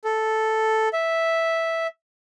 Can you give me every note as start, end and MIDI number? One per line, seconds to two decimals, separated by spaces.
0.04 0.89 69
0.93 1.87 76